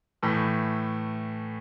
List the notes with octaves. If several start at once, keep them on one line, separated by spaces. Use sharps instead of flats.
A2 E3 A3